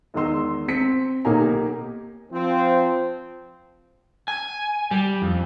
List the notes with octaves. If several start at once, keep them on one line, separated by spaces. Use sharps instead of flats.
E2 D#3 G#3 D#5 C6 E6
C4 B6 C#7
B1 A#3 D#4 G4 G#5 A#5
F3 C4
G#5
G3
F2